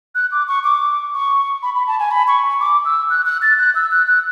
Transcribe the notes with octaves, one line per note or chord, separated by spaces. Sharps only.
F#6
D6
C#6
D6
C#6
B5
B5
A5
G#5
B5
C#6
D6
E6
F#6
F#6
A6
F#6
E6
F#6
F#6